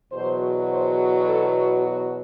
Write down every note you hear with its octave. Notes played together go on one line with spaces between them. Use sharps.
E2 B2 F#3 C5
C5
A4
F#4